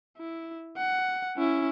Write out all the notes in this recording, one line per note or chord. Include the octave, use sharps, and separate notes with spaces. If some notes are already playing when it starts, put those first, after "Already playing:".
E4
F#5
C#4 E4